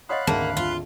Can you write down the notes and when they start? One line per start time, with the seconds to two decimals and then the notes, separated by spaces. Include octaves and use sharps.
0.09 C#5 D#5 F5 F#5 B5 C6 D#6 F#6
0.27 G#1 D2 A#3 G#4 A5
0.57 F4